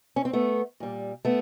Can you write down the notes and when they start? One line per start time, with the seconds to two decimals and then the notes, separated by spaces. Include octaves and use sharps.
0.16 C#4
0.25 C4
0.33 A3 B3
0.80 A#2 G3
1.25 A3 B3